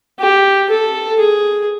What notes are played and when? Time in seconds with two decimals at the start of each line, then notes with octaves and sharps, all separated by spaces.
0.19 G4
0.70 A4
1.19 G#4